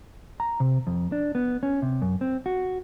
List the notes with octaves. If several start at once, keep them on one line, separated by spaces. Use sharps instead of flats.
A#5
C3
F2
D4
B3
C#4
C3
F#2
C4
F#4